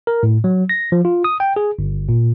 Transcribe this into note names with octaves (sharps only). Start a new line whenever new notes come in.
A#4
A2
F#3
A#6
F3
F4
D#6
G5
G#4
G1
A#2